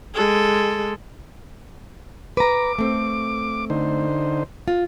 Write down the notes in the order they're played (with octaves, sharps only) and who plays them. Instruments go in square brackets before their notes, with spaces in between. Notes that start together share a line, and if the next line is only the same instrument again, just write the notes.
[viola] G#3 A4
[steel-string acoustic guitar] B4 A#5 [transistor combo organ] D6
[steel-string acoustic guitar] A3 C4
[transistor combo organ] D3 D#4 C5
[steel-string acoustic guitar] F4